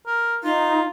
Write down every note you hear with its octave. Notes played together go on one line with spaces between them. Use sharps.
A#4
D#4 F4